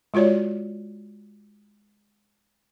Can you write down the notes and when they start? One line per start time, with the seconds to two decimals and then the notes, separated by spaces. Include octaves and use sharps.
0.14 G#3 F4 F#4 C#5 D5